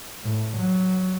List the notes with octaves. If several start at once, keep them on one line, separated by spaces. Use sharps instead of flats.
A2
F#3